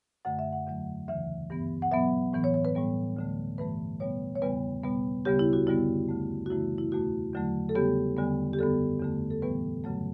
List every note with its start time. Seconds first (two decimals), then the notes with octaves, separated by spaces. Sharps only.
0.25 F#2 D3 A3 F#5
0.39 E5
0.53 F#5
0.67 E2 D3 F#3 A3
1.08 D2 C#3 E3 E5
1.50 G2 E3 B3
1.82 F#5
1.91 B2 F#3 B3 E5
2.33 A2 E3 B3
2.44 C#5
2.54 C#5
2.65 B4
2.75 A2 G3 B3
3.17 D2 D3 A3
3.58 G2 E3 A3 B4
4.00 B2 G3 B3 C#5
4.35 C#5
4.42 E2 C#3 G3 B3 B4
4.84 B2 G3 B3
5.25 D2 C#3 G3 B3 G4
5.39 E4
5.53 F#4
5.67 F#2 D3 G3 B3 E4
6.09 D2 D3 A3
6.46 F#4
6.50 F#2 C#3 E3 A3 E4
6.78 E4
6.92 E2 B2 A3 F#4
7.33 E2 D3 F#3 A3
7.69 A4
7.75 E2 C#3 G3 B3 G4
8.17 E2 D3 G3 B3
8.53 G4
8.59 F#2 D3 G3 B3 A4
9.00 E2 D3 A3
9.31 A4
9.42 A2 E3 G3 B3 B4
9.84 F#2 C#3 F#3 A3